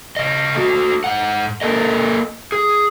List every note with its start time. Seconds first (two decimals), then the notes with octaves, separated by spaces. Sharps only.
0.17 C#3 D#5
0.55 A3 F#4
1.04 G#2 F#5
1.61 A#3 A4 A#4 D#5
2.52 G#4